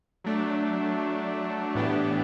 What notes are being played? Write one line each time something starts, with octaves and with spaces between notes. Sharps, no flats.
F#3 A3 D4
A2 E3 B3 D4 G4